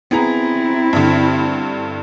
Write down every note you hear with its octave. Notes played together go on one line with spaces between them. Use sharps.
B3 C4 E4 G#4 A#5
G2 D3